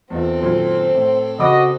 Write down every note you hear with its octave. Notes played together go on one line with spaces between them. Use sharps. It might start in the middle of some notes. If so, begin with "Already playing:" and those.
E2 C4 D#4 F4 A4
F#2 A#2 D#3 C5
A2
C#3 F#4 D#5 B5 D6